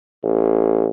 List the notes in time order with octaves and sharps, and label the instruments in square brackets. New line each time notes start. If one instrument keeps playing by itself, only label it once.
[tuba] A1